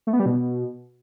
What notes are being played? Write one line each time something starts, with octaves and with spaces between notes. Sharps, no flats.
A3
B3
G3
B2